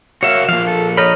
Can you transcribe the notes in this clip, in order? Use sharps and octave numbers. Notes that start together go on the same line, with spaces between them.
F#4 A#4 C#5 E5 F5
F3 A#3 F5
A4
A4 C#5 D#5 A#5 B5 F6